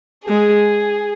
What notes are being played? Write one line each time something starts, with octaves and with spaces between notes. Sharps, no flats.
G#3 G#4